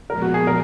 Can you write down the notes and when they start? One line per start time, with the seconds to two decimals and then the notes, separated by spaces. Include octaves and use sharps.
0.09 A#2 F3 G#3 B3 A#4
0.22 F#4
0.34 G#4
0.47 A#4